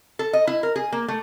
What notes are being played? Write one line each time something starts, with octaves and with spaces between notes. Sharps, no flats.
A4
D#5
E4
A#4
G#4
A#3
A3